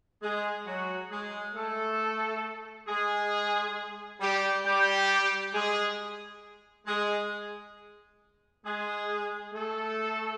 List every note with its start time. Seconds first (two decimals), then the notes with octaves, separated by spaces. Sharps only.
0.22 G#3 G#4
0.67 F#3 F#4
1.10 G#3 G#4
1.55 A3 A4
2.88 G#3 G#4
4.21 G3 G4
4.66 G3 G4
5.54 G#3 G#4
6.87 G#3 G#4
8.65 G#3 G#4
9.53 A3 A4